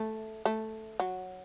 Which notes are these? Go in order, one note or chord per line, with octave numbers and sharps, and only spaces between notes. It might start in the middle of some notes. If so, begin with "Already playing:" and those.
Already playing: A3
A3
F#3